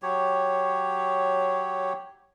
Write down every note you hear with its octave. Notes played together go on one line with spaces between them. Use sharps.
F#3 G4 C#5